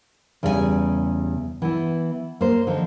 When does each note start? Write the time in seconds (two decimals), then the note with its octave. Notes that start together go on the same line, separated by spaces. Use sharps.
0.43 E2 C#3 G3 C#4 A#4 G#5
1.62 E3 B3 E4
2.41 A#3 C5
2.67 D3 F3 D#4